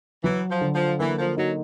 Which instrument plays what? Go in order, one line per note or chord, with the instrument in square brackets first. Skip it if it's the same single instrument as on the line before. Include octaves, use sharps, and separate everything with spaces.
[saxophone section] E3 [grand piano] F#3
[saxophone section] F3
[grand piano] D3
[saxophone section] F3
[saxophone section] E3 [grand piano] A#3
[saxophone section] F3
[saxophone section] F#3 [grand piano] D#4